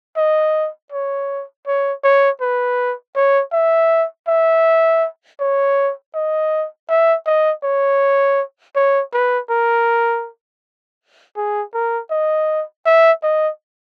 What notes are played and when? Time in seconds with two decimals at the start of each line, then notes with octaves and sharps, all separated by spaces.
0.17 D#5
0.92 C#5
1.67 C#5
2.04 C#5
2.41 B4
3.16 C#5
3.53 E5
4.28 E5
5.40 C#5
6.14 D#5
6.89 E5
7.26 D#5
7.63 C#5
8.76 C#5
9.13 B4
9.50 A#4
11.36 G#4
11.74 A#4
12.11 D#5
12.86 E5
13.23 D#5